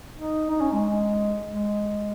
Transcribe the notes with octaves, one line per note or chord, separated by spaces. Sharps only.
D#4
D#4
C#4
G#3
G#3